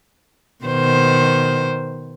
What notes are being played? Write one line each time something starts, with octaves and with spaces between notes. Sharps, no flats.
B2 D#3 C5